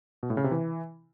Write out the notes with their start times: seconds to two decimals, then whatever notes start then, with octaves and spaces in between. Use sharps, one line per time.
0.23 B2
0.30 A2
0.37 C#3
0.44 C3
0.51 E3